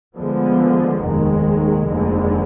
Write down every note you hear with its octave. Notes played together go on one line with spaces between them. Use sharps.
D2 D3 F3 G#3 B3
F1 D#2 D#3 G#3
F1 D#2 D3 G#3